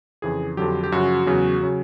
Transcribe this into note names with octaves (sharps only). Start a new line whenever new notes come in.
F2 C#3 E3 G#4
F2 D3 F#3 G4
G4
F#2 C#3 F3 F#4
E2 C#3 F#3
C#3 F#3